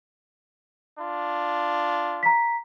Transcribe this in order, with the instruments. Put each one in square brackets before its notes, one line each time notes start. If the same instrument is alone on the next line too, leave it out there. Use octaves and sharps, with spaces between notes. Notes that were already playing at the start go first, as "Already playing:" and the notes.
[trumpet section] D4 F4
[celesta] A#5 B6